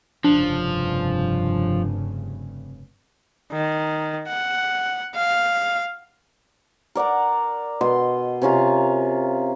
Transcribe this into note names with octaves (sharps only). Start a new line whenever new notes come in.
F1 G2 C#3 F3 D4
D#3
F#5
F5
A#4 D5 F#5 A#5
B2 D#5 C6
C3 C#4 F4 A#4